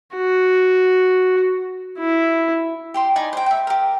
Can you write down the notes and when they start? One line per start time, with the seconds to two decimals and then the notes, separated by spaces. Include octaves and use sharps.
0.16 F#4
1.99 E4
2.94 G4 G5 C6
3.16 D#4 D5 G#5 B5
3.33 C5 G5
3.46 E5 G5
3.67 G4 A#4